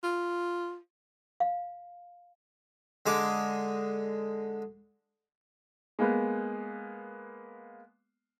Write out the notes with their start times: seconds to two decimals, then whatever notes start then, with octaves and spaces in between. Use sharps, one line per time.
0.03 F4
1.40 F5
3.06 D3 G#3 G#5 D6
5.99 G#3 A#3 B3